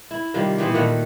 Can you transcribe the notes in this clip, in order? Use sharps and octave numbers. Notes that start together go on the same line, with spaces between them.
E4
C3 D#3 F3 G3
A#2 E3 B3 C5
A#2 D#3 A3 F#5